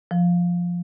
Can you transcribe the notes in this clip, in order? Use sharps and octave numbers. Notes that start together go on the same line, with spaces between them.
F3